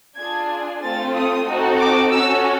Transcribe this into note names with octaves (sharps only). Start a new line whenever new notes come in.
D4 F4 G#4 G#6
A3 C4 F4 A4 A6
D#6
C4 D#4 F#4 A4
D6
C#4 F#4 A4 E6